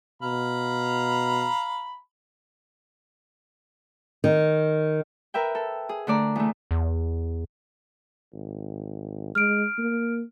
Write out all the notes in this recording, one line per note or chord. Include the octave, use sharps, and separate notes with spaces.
B2 F5 A#5 B5
D#3
A#4 B4 E5 G5
A4
G#4
D3 A3 D5 A#5
E2 A3
E2
G#1
G#3 F6 D7
A#3